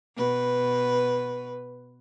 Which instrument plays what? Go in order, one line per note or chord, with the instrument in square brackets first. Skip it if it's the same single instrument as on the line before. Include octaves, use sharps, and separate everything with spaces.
[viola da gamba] B2 B4